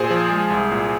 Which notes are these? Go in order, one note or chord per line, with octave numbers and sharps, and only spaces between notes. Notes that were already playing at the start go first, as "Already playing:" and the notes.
Already playing: A#2 G#4 C5
F3
G#3
C2
A#2